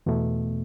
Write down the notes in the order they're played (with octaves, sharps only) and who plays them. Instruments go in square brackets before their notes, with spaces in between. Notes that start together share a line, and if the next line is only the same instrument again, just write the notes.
[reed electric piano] E2 B2 A3